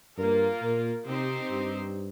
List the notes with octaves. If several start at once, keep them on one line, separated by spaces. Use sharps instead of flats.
G2 A#3 F4 A#4
A#2
C3 C4 D#4 G4 C5
G2